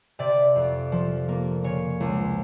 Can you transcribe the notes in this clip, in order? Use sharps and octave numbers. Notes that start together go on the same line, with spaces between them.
C3 D5
F2
F3
A#3
C#3 C#5
C#2